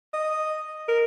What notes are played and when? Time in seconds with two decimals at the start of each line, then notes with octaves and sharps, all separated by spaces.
0.13 D#5
0.88 A#4